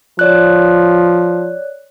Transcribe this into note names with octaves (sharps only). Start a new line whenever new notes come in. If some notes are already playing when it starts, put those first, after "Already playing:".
F3 C#5 D5 F#6